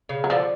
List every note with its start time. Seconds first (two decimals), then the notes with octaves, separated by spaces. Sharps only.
0.09 C#3
0.24 F#3
0.30 D3 F3